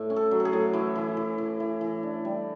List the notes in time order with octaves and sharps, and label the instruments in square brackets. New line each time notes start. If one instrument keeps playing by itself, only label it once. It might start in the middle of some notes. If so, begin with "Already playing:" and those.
Already playing: [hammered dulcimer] A2
C#4
A4
F#3
A4
G#4
A2
E3 E4
E3
E3
E3
E3
E3
D4
G3